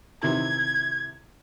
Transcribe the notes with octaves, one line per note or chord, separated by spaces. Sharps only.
C3 D#3 E3 G#6